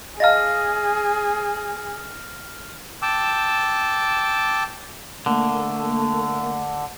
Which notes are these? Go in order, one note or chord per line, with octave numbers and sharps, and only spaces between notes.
G#4 D#5 F5 A5 F6 A#6
G5 A5 D6 E6
D3 A3 A#3